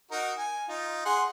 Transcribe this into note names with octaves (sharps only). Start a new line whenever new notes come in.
D#4 F#4 A#4
G#5
D#4 F4
G#4 F#5 C6